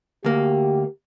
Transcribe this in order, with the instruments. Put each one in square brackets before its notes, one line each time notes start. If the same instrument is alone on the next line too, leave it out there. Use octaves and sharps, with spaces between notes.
[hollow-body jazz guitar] D2 A#3 [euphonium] G4